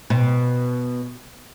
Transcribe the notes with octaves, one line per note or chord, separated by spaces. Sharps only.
B2